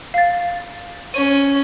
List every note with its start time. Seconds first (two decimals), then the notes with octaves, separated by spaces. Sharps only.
0.14 F5 A6
1.14 C#4 D#7